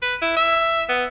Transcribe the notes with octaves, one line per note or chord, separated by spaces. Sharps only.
B4
E4
E5
B3